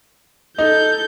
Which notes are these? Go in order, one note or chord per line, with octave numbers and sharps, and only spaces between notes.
D#4 A4 G6